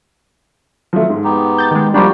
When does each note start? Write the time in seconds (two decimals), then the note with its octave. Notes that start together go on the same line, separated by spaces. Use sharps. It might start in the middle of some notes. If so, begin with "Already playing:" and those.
0.93 F3 F#3 A3
1.10 G#2
1.24 B3 D#4 G4
1.58 G6 A6
1.71 D#3 G#3
1.94 F3 G3 A#3 D4 D#4 F#4 G5